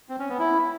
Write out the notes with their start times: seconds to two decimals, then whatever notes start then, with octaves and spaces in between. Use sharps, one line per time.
0.09 C4
0.19 C#4
0.29 B3
0.39 E4